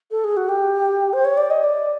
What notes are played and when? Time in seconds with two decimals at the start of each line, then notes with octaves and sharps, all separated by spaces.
0.11 A4
0.24 G#4
0.37 F#4
0.49 G4
1.13 C5
1.25 C#5
1.37 D5
1.50 D#5
1.64 D5